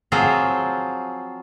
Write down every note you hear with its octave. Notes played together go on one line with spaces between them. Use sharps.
F3 F#3 C4 F4 G#4 C5